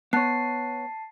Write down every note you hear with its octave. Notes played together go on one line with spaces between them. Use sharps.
B3 C#5 A5 C7